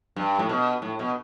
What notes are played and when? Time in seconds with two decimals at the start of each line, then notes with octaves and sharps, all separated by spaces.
0.16 G2
0.39 A2
0.49 B2
0.82 A2
0.99 B2